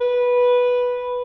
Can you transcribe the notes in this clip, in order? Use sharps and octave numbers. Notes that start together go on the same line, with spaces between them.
B4